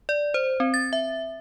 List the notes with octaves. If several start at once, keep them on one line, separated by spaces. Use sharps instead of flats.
D5
C5
C4
A6
E5